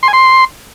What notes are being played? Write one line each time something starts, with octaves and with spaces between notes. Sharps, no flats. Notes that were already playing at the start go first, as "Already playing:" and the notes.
C6
G#5
C6